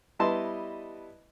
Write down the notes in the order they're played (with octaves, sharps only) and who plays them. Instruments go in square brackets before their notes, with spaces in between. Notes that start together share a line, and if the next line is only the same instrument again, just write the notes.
[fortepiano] G3 B3 E4 D#5 A5 C6